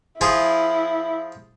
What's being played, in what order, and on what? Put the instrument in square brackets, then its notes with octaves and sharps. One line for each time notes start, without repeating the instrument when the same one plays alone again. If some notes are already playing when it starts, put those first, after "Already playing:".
[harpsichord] F3 F4 G#4 [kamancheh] E4